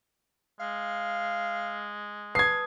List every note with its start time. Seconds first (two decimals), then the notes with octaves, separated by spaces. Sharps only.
0.60 G#3 F5
2.35 B4 A5 D#6 G#6 C7